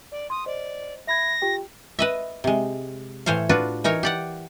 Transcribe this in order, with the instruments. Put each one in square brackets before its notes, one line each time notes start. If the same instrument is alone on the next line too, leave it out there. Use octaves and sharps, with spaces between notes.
[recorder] D5
[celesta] C6 [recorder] D#6
[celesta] C5 D#5 [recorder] D5
[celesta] E5 B5 G#6 [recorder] A#6
[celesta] F4 G4 G5
[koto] B4 D#5 E5
C3 G#3
A2 E3 C5 C#5 F5
D4 F4 F#4 B4
E3 D#4 A#4 C#5
G4 D5 F#5